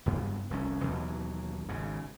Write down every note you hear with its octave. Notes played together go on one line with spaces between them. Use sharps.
F#1 G2 B3
F1 C2 A2 C#4
D#2 B2 E3 F#3
G#1 G#2 C#3